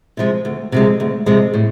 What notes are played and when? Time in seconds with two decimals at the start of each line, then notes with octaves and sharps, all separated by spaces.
0.17 C3 F3 G#3
0.45 D2
0.72 C3 F3 G#3
1.00 D2
1.26 C3 F3 G#3
1.54 A2